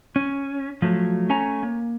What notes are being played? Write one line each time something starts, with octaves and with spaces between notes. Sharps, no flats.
C#4
F3 F#3 A3
A3 C#4 C#5 G#5 A#5
A#3